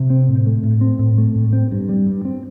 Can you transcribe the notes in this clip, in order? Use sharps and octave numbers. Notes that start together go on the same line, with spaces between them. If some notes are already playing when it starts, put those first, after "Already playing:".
Already playing: C3
C4
A2
A3
A2
C4
A2
A3
A2
C4
G2
G3
G2
C4